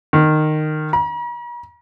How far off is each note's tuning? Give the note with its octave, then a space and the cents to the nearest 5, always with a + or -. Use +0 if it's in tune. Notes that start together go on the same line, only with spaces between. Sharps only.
D#3 -15
A#5 +45